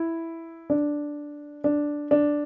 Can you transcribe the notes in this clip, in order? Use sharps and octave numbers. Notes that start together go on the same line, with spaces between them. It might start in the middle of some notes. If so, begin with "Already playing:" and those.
Already playing: E4
D4
D4
D4